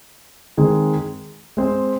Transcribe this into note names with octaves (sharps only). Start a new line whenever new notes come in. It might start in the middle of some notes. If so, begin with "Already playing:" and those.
D#3 G#3 C4 G#4
G#3 C4 G#4 C5